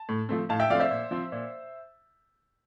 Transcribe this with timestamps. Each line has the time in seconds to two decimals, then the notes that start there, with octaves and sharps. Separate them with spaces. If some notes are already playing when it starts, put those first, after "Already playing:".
Already playing: A5
0.09 A2
0.29 F3 A3 C4
0.49 A2 F5 A5
0.60 E5 G5
0.70 F3 A3 C4 D5 F5
0.80 C5 E5
0.91 A#2
1.11 F3 C4
1.32 A#2